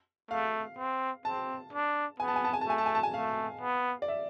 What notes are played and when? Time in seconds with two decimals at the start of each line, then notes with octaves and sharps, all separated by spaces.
0.31 A3 F5
0.78 C4
1.25 C4 A5
1.73 D4
2.20 B3 G#5
2.28 A5
2.36 G#5
2.44 A5
2.53 G#5
2.61 A5
2.67 A3 G#5
2.78 A5
2.86 G#5
2.95 A5
3.03 G#5
3.14 A3 F5
3.61 B3
4.02 D5
4.08 E5